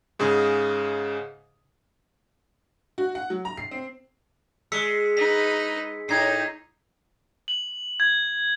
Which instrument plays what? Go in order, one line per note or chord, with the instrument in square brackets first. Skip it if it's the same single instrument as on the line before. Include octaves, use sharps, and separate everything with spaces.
[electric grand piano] G#2 C#3 G#4
[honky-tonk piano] F#4
F#5
F#3
A#5
C7
C4
[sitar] G#3 [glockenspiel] E6 B6 C#7
[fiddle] D#4 B4 [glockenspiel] B6
[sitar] A2 [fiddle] D#4 [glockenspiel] G#6 C7
[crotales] F#7
G#6